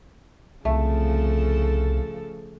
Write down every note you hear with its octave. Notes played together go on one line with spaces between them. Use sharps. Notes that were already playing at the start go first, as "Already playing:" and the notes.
C2 C#3 F3 A3 A4